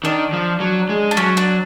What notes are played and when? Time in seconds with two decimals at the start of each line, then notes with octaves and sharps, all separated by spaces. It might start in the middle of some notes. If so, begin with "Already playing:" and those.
0.04 D#3 D4
0.33 F3
0.60 F#3
0.89 G#3
1.11 D4
1.17 F#3 C#4
1.37 D4